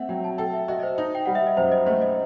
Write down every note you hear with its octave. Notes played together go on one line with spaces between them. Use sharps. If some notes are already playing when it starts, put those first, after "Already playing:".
Already playing: A3 C4 E5 F#5
F#3 G5
A5
A4 G5
E5
F#4 D#5
D#5
C5
D#4
G5
G3 F#5
E5
D#5
F#2 C5
D#5
A3 C5
D#5